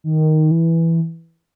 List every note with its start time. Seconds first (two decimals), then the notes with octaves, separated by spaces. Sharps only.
0.04 D#3
0.51 E3